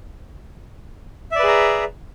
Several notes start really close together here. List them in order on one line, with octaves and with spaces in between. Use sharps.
E5 D5 B4 G#4 A#5